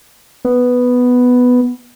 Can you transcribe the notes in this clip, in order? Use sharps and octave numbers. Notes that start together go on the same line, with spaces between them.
B3